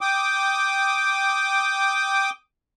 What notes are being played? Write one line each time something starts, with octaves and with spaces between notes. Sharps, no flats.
G5 D6 D#6